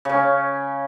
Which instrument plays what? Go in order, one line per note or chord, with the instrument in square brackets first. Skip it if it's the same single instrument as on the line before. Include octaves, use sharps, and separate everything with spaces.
[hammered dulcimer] C#3 C#4